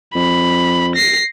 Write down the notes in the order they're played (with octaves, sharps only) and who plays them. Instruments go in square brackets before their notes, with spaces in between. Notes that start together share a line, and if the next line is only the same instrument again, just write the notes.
[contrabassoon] F2 [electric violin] B5
[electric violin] A#6 C7